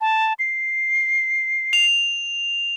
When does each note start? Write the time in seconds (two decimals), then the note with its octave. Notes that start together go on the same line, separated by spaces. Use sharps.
0.01 A5
0.39 C7
1.73 F7